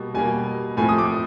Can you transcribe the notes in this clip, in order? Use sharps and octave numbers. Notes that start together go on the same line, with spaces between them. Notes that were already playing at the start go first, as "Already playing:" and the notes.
Already playing: B2 G3 A#3
B2 G3 A#3 G#5
A2 F3 A3 C4 G#5
D#6
D6